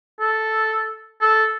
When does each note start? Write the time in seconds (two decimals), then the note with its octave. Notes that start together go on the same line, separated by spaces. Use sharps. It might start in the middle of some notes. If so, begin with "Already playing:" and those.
0.20 A4
1.21 A4